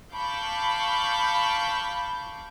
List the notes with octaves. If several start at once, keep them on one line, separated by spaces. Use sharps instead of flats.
F5 A5 B5 C#6 D6 G6